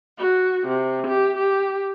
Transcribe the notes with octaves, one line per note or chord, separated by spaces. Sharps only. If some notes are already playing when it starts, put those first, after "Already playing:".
F#4
C3
G4
G4